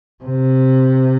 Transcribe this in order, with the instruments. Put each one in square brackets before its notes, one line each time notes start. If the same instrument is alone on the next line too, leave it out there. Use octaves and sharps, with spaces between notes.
[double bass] C3